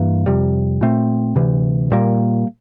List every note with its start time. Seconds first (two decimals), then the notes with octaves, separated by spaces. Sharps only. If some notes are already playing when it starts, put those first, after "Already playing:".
Already playing: G2 E3 A#3
0.26 F2 C3 G3
0.81 A#2 A3 C4
1.36 D2 C3 E3
1.92 A#2 G3 A#3